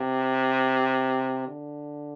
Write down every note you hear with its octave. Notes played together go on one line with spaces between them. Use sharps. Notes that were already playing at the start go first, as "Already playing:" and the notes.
Already playing: C3
D3